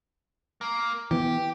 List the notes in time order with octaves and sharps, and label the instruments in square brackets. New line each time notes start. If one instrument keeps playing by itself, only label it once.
[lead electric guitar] A#3
[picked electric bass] E3 B3 [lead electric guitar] G4